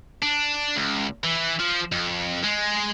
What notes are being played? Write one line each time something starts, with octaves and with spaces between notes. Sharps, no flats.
D4
C#2
E3
F3
F2
G#3